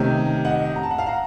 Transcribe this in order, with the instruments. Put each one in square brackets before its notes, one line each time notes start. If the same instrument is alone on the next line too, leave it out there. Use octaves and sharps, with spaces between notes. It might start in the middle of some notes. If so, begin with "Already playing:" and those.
Already playing: [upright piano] C3 D#3 A3 C#4
D#5 F#5
A#5
A5
F#5
F5 A5
F#5 A#5